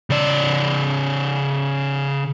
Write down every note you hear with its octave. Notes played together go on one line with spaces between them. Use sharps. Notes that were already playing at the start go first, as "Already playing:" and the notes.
C#3 D5